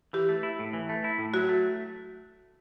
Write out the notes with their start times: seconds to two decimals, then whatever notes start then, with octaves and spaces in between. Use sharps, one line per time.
0.13 E3 G4
0.29 A3
0.43 E4
0.59 A2
0.73 E3
0.89 A3
1.04 E4
1.19 A2
1.33 F#3 F#4
1.49 A3